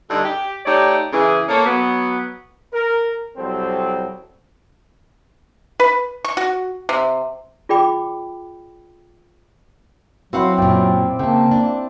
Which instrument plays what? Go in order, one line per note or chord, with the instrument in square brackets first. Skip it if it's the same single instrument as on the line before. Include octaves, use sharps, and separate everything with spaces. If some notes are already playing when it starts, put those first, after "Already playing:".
[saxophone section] G2 D3 G3 A3 D4 D#4
G4
A3 D#4 G4 C#5 D5
C#3 E3 G#4
A#3 A4 C#5
F#3 B3
[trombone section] A#4
C2 F#3 G3 C4 A4 C5
[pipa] B4
C#6
F#4
C3
[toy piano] F4 G#4 D5 G5 B5 D6
[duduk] F#3 [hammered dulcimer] C4 E4 C5 [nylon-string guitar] F#4 F5 F#5
[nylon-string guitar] F#2 A#2 [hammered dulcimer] G4 D5 G5
[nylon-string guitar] C#3 [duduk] A#3 [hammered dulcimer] G5 A5
[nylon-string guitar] D4